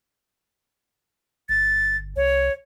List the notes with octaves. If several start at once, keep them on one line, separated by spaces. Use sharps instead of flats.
G1 A6
C2 C#5